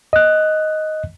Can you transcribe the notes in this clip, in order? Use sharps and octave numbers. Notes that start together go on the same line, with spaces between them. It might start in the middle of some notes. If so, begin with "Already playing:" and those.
D#5 F#6